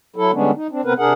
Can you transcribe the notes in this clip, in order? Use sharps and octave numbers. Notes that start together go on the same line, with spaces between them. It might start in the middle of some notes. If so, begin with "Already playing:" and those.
F#3 E4 A4
D3 G3 G#3 B3 C#4 D4
D#4
C4 D4
C3 B3 C4 A#4 B4
C3 D4 G#4 A#4 F#5